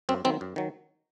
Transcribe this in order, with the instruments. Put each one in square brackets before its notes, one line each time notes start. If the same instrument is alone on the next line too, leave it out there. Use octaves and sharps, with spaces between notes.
[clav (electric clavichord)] F#2 C4
D#3 F#3 C4
F#2
D#3 F#3